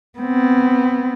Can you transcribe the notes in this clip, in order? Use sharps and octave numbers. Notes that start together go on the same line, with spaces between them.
B3 C4